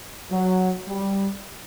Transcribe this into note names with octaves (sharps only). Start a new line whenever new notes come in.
F#3
G3